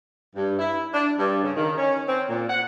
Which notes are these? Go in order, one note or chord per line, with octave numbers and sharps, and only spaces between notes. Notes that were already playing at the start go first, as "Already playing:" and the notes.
G2
E4
D4
G2
C#3
D#3
C#4
C4
A#2
F#5